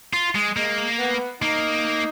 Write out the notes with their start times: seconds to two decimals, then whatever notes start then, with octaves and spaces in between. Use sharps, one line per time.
0.13 F4
0.35 G#3
0.57 G#3 A#3
0.99 B3
1.41 A#3 D#4